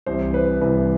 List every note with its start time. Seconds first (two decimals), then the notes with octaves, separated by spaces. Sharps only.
0.06 C2 C3 E3 C5
0.34 B4
0.61 C2 C3 E3 B4